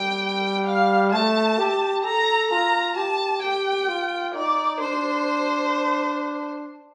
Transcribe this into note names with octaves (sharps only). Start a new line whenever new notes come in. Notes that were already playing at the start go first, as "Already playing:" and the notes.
Already playing: G3 G5
F5
A3 A5
G4
A4 A#5
F4 A#5
G4 A5
G4 G5
F4
D#4 D5
D4 C5